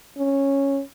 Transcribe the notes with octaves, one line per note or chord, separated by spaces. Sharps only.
C#4